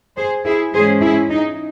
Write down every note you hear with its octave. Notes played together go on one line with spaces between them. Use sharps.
G#4 C5
E4 G#4
G#2 E3 G#3 C#4 G#4 C5
E4 G#4
D#4